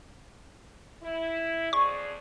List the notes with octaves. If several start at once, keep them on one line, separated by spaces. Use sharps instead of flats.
E4
F2 G#4 D5 C#6